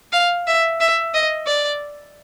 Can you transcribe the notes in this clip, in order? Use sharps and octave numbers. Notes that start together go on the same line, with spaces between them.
F5
E5
E5
D#5
D5